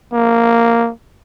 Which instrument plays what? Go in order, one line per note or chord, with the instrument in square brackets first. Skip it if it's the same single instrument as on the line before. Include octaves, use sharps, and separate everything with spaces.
[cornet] A#3